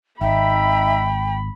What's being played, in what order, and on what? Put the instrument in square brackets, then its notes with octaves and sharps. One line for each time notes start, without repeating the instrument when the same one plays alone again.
[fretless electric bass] G#1 [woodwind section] D#4 E5 [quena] G5 [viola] B5